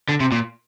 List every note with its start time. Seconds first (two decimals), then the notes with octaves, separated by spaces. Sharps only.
0.09 D3
0.21 C3
0.32 A#2